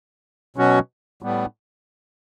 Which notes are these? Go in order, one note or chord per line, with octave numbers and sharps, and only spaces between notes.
B2 F#3 C#4 F#4
A2 G3 B3